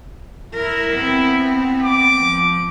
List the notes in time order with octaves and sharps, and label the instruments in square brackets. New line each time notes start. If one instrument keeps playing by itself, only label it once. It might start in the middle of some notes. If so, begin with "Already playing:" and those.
[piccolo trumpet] E4 [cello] A#4
[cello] B3 C4
[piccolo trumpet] D6
[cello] F3